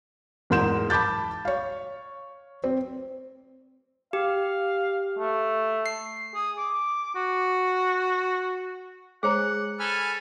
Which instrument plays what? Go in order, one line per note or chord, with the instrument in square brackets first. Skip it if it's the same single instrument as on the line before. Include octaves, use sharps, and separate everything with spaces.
[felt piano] E2 G#2 A#4 C6 G6 E7
A5 B5 D6 G6 A6
C#5 F5
C4
[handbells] G4 [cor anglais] F5
[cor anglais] A3
[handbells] C7
[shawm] G#4
D6
F#4
[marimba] G#3 C#5 A#5 [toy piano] G#4 C5 [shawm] F#5
[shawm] A4 [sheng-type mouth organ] G#5 B5 F6